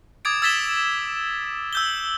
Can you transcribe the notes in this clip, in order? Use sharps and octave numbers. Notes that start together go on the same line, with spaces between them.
D6 D#6 G#6 A6 D7
E6 G#6 A6 B6 E7 G7
E6 G6 G7